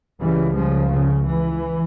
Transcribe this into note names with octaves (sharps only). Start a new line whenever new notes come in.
C#2 C#3 E3 G3
C#3 F3
C#3
E3